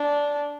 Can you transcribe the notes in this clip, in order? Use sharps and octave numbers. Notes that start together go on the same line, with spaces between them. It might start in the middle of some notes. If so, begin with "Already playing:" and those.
Already playing: D4